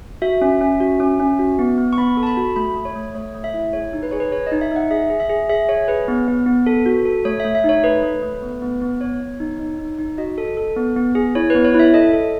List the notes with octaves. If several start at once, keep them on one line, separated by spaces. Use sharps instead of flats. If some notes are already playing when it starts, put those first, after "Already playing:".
F#4 E5
C#4
C#4
F#4
C#4
C#4
F#4
B3
B3
C#6
B3 B5
A4
A5
B5
F#4
A3 B5
A3
C#5
A3
A3 C#5
A3
E5
E4
G#4 C#5
D#4
B4
G#4 C#5
B4
G#4 C#5
D#4 D#5
E5
D#4 F#5
G#4 E5
G#4
E5
G#4
G#4 E5
G#4 C#5
G#4 B4
B3
B3
B3
A4
F#4
A4
A3 C#5
E5
A3
E5
D#4 C#5
A3 B4
A3
A3
B3
B3
B3
B3 C#5
B3
D#4
D#4
D#4
D#4
F#4 D#5
A4
A4
B3
B3
G#4
E4 C#5
B3 B4
C#5
E4 E5
A4 D#5
A4